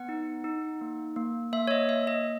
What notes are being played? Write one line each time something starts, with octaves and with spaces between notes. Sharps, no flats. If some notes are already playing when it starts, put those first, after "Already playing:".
Already playing: B3 F#5
D#4
D#4
A#3
A#3
A#3 E5
C#5
D#5
A#3 E5
D#5